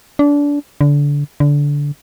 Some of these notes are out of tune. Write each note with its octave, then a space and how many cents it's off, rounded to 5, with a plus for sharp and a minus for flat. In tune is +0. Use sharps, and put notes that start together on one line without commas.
D4 -25
D3 -25
D3 -20